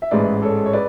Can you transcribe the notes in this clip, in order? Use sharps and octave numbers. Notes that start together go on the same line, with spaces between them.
E5
A1 G#2 G#3 B4 D5
A4 C#5
C#5
B4 D5